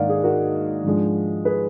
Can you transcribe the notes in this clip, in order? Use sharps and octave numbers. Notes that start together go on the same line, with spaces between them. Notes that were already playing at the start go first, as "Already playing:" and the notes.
Already playing: G#2 D#3 A#3 D4 D5 D#5 F5 F#5
G#4
F#4 A#4
G#2 F3 G#3 D4
G#4 B4